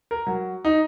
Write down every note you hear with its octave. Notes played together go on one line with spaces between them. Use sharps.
A#4
F#3
D#4